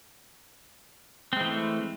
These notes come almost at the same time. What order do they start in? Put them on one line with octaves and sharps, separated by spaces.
C4 G#3 E3 A3